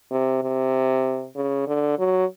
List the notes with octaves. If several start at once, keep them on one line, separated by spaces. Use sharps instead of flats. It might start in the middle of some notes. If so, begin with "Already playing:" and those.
C3
C3
C#3
D3
F#3